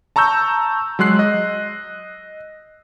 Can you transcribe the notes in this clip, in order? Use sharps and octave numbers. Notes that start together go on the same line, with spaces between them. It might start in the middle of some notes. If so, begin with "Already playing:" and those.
A5 A#5 C#6 E6 G6
F#3 G#3 C6 F#6 C7
D#5